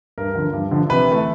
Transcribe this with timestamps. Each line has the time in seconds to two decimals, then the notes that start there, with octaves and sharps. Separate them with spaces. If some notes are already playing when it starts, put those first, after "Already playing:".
0.18 G2 A#4
0.35 D3 F3
0.53 G2
0.71 D3 F3
0.89 C3 B4
1.07 E3 A3